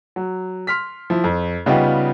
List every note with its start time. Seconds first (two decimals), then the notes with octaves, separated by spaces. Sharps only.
0.16 F#3
0.67 C6 F6 B6
1.10 F3 E4
1.24 F2
1.66 C#3 G3 B3 D#4 F4 G4